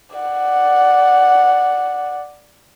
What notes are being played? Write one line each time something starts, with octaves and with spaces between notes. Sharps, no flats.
D5 F#5